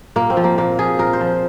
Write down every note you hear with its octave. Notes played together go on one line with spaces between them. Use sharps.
A#2 A#3
C4
F3
A#3
A#2 A#3
F3 G#4
A#2 A#4
C5
F3